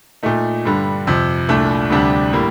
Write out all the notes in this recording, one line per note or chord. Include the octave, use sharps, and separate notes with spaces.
A#2 A3 D#4
G2 D3 G3
F2 C3 F3
C2 A#2 A3 D4
D2 C3 G3 D4
A2 G3 A#3